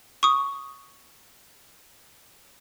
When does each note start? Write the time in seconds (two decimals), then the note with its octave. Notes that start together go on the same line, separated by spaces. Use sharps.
0.23 C#6 D#6